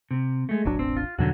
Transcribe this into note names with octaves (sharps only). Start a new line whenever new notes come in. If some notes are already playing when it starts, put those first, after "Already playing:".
C3
G#3 A3
E1 A1 F#3 D4
C4
F4
E2 G2 B2 D3 F#3 F#4